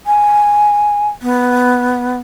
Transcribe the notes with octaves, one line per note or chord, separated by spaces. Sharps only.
G#5
B3